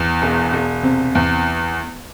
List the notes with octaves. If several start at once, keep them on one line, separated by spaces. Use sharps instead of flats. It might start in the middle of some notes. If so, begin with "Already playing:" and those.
Already playing: E2
E1
E1
C3
E2